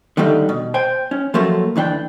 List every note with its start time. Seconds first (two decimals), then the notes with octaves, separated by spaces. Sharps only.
0.17 D3 D#3 G3 A3 D#4
0.49 B2
0.74 C5 G5 G#5
1.11 C#4
1.34 F3 F#3 A3 A#3 F4
1.76 D2 E3 D4 G5